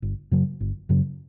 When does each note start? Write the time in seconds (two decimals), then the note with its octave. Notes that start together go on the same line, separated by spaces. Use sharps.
0.02 G1
0.31 F#2 C#3 F#3
0.61 G1
0.89 F#2 C#3 F#3